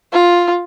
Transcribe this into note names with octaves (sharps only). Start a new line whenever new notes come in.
F4